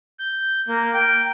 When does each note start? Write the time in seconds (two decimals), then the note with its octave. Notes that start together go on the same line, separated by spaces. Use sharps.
0.19 G6
0.68 A#3
0.94 G5